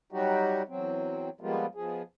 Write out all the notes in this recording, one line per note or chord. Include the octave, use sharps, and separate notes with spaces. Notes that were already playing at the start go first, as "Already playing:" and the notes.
F#3 G3 D#4 F#4 G4
E2 F#3 C4
F3 G3 G#3 A#3 B3 F4
B2 F3 G#4